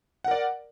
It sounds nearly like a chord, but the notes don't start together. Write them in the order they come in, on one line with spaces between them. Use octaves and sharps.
F#5 A#4 D5